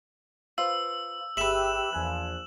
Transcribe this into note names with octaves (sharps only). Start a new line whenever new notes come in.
F4 B4 C5 F5 E6
G1 G4 G#4 B4 E5 E7 F#7
A#1 E2 F3 G#5 F#6